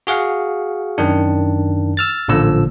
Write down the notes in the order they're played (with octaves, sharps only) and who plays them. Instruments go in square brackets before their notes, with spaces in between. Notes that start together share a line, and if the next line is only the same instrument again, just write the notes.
[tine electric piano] F#4 G#4 F5 F#5
F#2 D#3 D4
E6 F6 A6
A1 A#2 D3 F3 E6